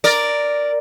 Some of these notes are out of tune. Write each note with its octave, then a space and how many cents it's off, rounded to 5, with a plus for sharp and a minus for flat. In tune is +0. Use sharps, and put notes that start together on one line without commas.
A#4 +0 D5 +0